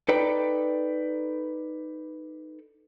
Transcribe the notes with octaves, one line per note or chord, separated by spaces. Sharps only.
D#4 A4 B4 D5 G5 A#5